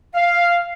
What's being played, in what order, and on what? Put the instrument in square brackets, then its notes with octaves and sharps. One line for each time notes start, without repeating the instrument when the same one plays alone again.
[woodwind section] F5